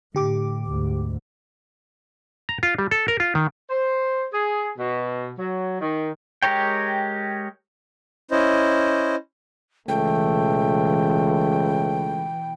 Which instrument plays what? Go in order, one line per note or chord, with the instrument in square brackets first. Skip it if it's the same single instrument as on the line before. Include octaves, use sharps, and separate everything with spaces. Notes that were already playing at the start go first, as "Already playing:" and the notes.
[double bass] A2 [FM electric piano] D3 G4 D6
[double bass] D2 G#2
[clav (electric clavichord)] A#5
F4
G3
A4
A#4
F4
D#3
[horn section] C5
G#4
B2
F#3
D#3
[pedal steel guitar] G#3 G4 A#4 C#5 G5
[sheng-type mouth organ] C#4 E4 C5 D#5
[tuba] C#2 [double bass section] B2 E3 [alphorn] A3 [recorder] G5